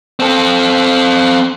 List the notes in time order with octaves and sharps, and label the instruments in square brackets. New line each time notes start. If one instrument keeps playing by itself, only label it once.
[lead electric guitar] C4 A4